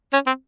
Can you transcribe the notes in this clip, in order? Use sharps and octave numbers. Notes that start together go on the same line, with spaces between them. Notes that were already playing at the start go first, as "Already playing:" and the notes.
C#4
C4